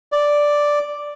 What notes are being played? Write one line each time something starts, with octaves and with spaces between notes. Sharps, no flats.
D5